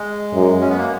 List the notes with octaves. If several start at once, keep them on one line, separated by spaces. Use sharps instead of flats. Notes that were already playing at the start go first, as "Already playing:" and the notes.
Already playing: G#3
F#2
C#4
B3
A#3